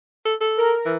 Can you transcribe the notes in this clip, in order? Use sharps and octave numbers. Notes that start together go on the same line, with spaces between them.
A4
A4
A#4
E3